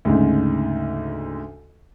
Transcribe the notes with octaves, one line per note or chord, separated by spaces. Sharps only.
D2 G#2 C#3